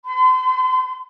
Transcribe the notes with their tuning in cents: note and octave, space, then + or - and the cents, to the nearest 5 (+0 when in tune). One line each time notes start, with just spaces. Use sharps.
C6 -40